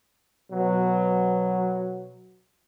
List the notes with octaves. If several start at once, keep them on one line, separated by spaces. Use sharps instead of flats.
B2 F#3